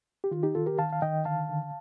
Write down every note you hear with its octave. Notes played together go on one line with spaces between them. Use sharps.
G4
D#3 F4
D#4 G4
D#3 F4 A4
G4 A#4
D#3 F5 A5
F5
D#3 D#5 G5
D3 F5 A5
D3